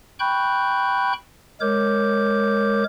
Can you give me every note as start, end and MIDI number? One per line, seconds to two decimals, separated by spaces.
0.20 1.13 79
0.20 1.13 83
0.20 1.13 85
0.20 1.13 90
0.20 1.13 91
1.61 2.84 56
1.61 2.84 70
1.61 2.84 73
1.61 2.84 86
1.61 2.84 91